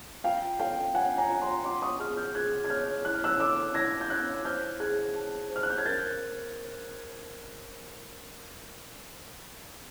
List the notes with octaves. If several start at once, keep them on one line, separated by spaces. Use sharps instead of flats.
F4 F5 G5
A4 F5 G5
F4 F#5 G#5
G#5 A#5
F4
A#5 C6
F#5 C6 D6
C#6 D#6
G#4 D#6 F6
F6 G6
G#4 F#6 G#6
G#6
C#5 F6 G6
E4 F#6
F6
E6 F#6
A4 D6 E6
E4 G#6 A#6
G6
C#5 F#6 G#6
C5 F6 G6
G#4 F#6 G#6
A5
C5
F6
F#6
G6
G#6
A#4 G6 A6